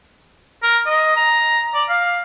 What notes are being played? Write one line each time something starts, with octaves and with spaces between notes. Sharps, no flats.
A#4
D#5
A#5
D5
F5